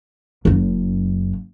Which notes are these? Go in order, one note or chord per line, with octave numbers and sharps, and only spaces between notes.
F#1 F#2